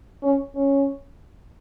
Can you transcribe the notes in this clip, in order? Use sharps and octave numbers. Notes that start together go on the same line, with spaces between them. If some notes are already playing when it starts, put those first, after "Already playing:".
C#4
C#4